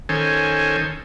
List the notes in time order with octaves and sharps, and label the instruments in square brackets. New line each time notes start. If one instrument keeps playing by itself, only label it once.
[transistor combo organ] D#3 C#4 A4 C5 G#5